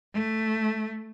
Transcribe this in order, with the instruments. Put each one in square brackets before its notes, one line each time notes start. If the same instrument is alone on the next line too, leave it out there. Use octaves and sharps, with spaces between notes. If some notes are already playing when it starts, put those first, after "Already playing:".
[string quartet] A3